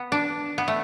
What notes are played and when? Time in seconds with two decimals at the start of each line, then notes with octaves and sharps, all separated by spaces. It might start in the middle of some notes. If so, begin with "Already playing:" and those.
Already playing: B3
0.12 D4
0.58 B3
0.68 A3